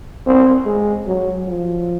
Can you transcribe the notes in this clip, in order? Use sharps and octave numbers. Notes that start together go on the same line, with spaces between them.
C4
G#3
F#3
F3